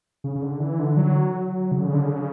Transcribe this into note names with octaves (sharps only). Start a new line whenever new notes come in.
C#3
C#3
D3
E3
D3
F#3
C#3
D3
C#3
D3
C#3
D3
C#3